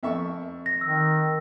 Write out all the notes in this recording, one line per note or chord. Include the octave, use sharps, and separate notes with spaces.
F2 E5 C#6
A#6
D#3 E6